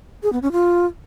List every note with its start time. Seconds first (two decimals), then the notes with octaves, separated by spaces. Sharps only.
0.23 G#4
0.33 B3
0.42 C#4
0.52 F4